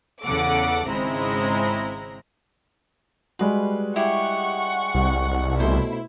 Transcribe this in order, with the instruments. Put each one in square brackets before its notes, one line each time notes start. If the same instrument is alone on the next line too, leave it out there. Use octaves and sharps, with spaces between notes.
[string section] E2 C#3 A4 F#5 D6
G#1 C#3 G#3 C4 E4 A#5
[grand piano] G3 G#3 F#4 [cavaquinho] B4
[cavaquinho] E4 G4 G#4 [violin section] F#5 C#6
[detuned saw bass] C2
[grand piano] B2 A3 [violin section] E4 [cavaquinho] C5